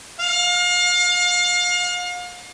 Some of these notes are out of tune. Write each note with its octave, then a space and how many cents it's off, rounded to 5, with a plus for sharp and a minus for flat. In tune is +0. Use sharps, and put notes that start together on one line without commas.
F5 +35